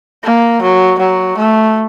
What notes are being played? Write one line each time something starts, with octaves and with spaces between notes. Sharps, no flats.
A#3
F#3
F#3
A3